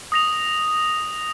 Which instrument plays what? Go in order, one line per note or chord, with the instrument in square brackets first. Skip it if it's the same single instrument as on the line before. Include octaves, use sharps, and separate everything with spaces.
[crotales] D#6 A#6 F7